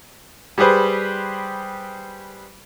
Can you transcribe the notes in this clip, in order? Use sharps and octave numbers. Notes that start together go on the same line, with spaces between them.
G3 G4 G#4 B4 C5